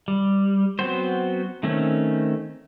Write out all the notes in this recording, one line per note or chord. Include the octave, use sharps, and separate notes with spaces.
G3
F#3 B3 C4 F#4 C5
D#3 A3 C4 C#4